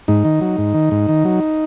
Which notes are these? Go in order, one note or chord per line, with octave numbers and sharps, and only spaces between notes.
G#2 D#4
D#3
F#3
G#2
D#3
G#2
D#3
F#3